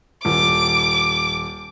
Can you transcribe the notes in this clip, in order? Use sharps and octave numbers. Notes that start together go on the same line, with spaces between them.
D#1 D6